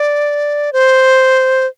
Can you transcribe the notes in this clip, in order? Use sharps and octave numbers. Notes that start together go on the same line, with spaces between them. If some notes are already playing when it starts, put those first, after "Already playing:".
Already playing: D5
C5